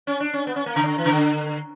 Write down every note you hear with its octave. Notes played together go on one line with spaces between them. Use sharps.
C#4
D4
C#4
B3
C#4
A#3
C#3
D3
E3
C#3
D3